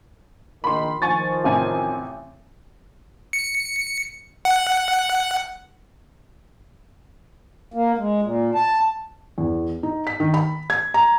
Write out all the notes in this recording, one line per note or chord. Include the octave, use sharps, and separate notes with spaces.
A#1 D#3 B5 C6
D#3 F3 G#5 C#6 A6
A1 C3 G#5
C#7
F#5
A#3
G#3
A#2
A5
E2
D#4
B6
D#3
B5
G#6
A#5